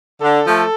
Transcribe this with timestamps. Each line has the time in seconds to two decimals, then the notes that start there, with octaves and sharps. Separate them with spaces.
0.20 D3 A4
0.44 F3 A3